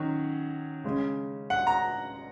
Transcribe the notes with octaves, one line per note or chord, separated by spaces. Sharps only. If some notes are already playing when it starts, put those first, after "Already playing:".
Already playing: D#3 F#3 C#4
C#3 G#3 C#4
F#5
A#5